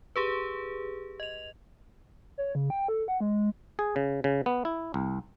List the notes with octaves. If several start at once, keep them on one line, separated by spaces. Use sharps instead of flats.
G4 G#4 B4
D#5 F7
C#5
C#3
G5
A4
F#5
G#3
G#4
C#3
C#3
B3
E4
C2